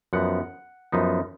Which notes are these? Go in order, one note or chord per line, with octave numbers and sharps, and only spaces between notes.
F#2 F3 B3 D#4 F#5
F#2 F3 B3 D#4